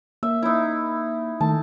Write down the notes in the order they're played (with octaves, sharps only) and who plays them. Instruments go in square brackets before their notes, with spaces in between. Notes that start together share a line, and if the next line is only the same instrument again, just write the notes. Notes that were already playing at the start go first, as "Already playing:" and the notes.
[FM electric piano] A#3 [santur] E5
[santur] D#4 E4
[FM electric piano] D#3 A3 [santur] A5